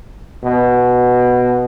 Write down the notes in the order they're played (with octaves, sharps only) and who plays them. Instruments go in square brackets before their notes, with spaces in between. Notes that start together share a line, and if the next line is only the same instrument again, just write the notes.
[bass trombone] B2